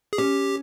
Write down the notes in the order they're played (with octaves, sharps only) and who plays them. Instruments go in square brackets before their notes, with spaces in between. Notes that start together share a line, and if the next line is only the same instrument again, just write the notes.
[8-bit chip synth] G#4
[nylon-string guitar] C#4 [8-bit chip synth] G4